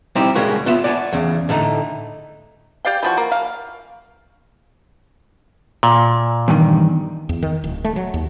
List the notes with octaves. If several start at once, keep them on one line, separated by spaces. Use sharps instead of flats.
G3 C4 D#4 E4 G4 C5
C#3 G3 G#3 A#3 F#4
B3 F4 E5
D5 F#5 G#5 A5
E2 C#3
A2 D3 A3 D#4
G4 D5 F5 G5
E3 F3 F#4
A#3
F5
A#2
E2 G2 D#3
E2
D#3
D1
A3
F#3
D#2